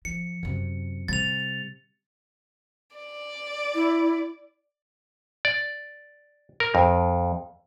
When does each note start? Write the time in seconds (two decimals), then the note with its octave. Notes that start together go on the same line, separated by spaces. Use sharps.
0.05 F3 C#7
0.43 F#2 C3
1.08 C3 G3 A6 F7
2.97 D5
3.75 E4
5.45 D5
6.60 A#4
6.75 F2